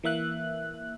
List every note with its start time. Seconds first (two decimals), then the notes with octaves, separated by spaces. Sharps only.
0.03 E3 A#3 E5 F#6